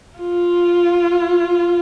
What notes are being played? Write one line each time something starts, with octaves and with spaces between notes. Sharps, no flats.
F4